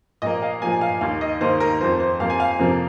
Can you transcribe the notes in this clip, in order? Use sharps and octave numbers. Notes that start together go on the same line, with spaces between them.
A#2 F3 A#3 D#5
F5
A#2 F3 A#3 G#5
F5
D#2 D#3 A#3 F5
D#5
D#2 D#3 A#3 C5
A#4
F2 F3 A#3 C5
C5
F2 F3 A#3 F5
G#5
F5
F2 C3 F3 A#3